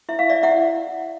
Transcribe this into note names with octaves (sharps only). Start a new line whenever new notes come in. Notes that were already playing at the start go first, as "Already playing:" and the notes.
E4 E5
F5
D5 E5
E4 E5 F#5